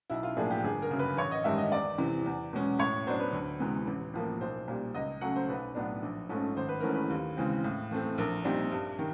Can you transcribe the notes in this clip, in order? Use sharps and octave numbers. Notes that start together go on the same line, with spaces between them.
B1 E4
F4
A2 F3 A#3 D4 G#4
G4
G1 G#4
A#4
F#2 C#3
B4
A1 C#5
D#5
G2 D#3 G#3 E5
D#5
E2 D5
C3 E3
E2
B2 G#3 C#4
A2 C#5
F#3 B3 D4 C5
B4
D2
C3 E3 G#3 B3
A1
A2 F3 A#3
B1 C5
A#2 G3
C#2 D#5
C#3 F#3 A3 C#4 F#5
C5
B1 B4
A2 F#3 B3 D4
A#1
G#2 F3 A3 C#4
G#1 C5
B4
G#2 E3 A3 C#4 A#4
B4
D#2
C#3 E3 G#3 C4
A2
E3 A3 C4
A#1 A#4
A#2 G3 C4 D#4
G2
D#3